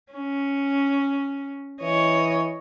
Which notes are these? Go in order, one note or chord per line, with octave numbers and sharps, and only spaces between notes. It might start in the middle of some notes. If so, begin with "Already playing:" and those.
C#4
E3 C#5 D#5